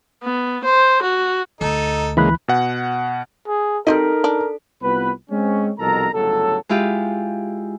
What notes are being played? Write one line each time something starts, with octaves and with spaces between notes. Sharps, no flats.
B3
C5
F#4
D2 D#4 A4
C#3 E3 G#3 A#3 B5 F#6
B2 F#5
G#4
G3 C4 D#4 A4 A#4 D#5
D4
C2 B3 F4 B4
G#3 C4 C#4
C2 F2 B2 A4 A#4 A#5
G1 A2 C#3 F#3 A4
G#3 E4 F4 G4